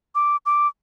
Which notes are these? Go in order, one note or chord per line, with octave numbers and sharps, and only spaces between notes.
D6
D6